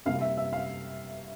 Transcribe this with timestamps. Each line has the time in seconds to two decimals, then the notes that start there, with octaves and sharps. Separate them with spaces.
0.06 C3 G3 A#3 E4 F5
0.21 E5
0.37 E5
0.53 F5